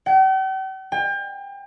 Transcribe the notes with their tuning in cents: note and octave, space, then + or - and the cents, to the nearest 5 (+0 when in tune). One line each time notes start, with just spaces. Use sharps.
G5 -45
G5 +35